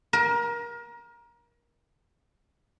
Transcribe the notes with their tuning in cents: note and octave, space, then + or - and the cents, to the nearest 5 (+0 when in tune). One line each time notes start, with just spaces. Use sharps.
A#4 +25